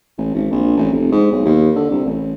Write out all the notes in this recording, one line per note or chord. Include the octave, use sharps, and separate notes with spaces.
A1
G#1
A#1
A1
F1
G#2
B1
D#2
D3
C2
A1